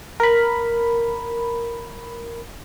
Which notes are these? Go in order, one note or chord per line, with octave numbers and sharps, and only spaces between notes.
A#4 B5